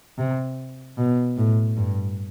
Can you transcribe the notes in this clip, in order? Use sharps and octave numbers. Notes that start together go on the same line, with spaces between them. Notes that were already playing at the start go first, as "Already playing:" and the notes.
C3
B2
A2
G2